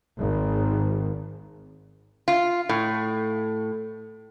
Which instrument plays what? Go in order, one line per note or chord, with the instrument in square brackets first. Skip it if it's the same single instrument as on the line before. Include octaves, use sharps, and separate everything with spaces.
[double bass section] G#1
[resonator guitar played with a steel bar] F4
A2